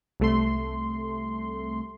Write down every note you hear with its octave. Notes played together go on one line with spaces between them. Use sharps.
C2 A3 C6